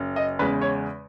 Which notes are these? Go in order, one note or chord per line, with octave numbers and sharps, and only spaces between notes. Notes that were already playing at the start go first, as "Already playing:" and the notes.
Already playing: F#1
D#5
E2 C#3 G#3 B4
C#5